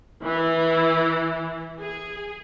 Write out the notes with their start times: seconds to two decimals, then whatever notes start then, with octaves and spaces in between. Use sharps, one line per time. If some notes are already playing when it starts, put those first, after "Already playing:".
0.23 E3
1.79 G#4